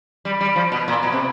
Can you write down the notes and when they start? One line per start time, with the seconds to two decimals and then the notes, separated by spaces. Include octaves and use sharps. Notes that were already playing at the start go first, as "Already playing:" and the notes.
0.25 G3
0.41 G3
0.56 F3
0.72 B2
0.88 A#2
1.03 B2
1.12 C3